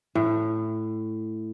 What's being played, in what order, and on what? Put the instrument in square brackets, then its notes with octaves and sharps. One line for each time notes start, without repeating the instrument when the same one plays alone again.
[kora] A2